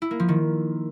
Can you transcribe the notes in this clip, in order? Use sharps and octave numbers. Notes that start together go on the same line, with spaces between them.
E4
A#3
F3
D#3